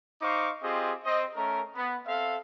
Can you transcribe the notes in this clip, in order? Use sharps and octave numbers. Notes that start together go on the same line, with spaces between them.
D#4 C5 F5 C#6 D6
C4 F4 G4 G#4 D#5
C4 D#5
A3 C#4 A#4
B3
C4 A4 E5 F5